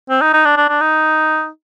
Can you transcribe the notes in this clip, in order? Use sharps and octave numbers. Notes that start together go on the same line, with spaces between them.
C4
D#4
D#4
D4
D4
D4
D#4